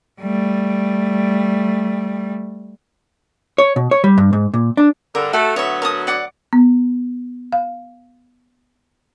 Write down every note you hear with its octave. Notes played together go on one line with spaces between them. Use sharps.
G3 A3
C#5
B2
C#5
G3
G2
G#2
A#2
D4
G2 D3 A#4
A3 F#4 A4
D2 F#3 B3 C#5 E5
A#4 A5 D#6
D5 F#5 D6
B3
F5